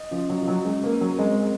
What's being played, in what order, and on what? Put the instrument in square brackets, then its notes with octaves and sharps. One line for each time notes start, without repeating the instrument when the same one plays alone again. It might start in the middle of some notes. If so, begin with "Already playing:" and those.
Already playing: [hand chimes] D#5
[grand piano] F3 [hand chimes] C#4
[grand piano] F#3
[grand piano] F3 [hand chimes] D#5
[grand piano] F#3
[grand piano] G#3 [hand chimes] C#4
[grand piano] A#3
[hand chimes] A#4
[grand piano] F#3
[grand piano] G#3 [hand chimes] C4